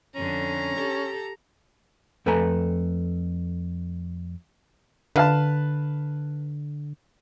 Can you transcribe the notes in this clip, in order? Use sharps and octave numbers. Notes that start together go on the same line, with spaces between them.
F2 D3 C#4 A#5
G4 A4
F2 A3 A4 B4 G#5 A#5
D3 B4 F5 A5